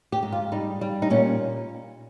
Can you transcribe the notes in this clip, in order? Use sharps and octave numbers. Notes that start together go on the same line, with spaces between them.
G4
G#2
F4
G3 D#4
G3
D#4
A#2 C#4